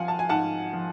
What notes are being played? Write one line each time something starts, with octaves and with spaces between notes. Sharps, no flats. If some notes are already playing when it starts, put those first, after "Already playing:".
Already playing: F3 F5 F#5 G#5
A5
G#5
G#2 F#5 A5
F3